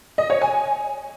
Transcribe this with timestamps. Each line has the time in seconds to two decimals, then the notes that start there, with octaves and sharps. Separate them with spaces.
0.18 D#5
0.30 C#5
0.41 G#5